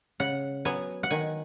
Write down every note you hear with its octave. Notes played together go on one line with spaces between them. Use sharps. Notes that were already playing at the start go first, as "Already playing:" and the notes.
C#3 F#5
F#3 B3 G#5
F#5
D#3 G#5